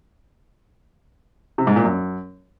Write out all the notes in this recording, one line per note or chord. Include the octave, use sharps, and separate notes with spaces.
C3
G#2
A#2
F#2